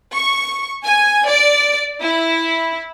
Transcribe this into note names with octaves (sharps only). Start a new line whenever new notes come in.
C#6
G#5
D5
E4